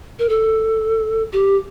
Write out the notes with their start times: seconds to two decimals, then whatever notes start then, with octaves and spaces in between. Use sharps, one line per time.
0.19 A#4
0.29 A4
1.33 G4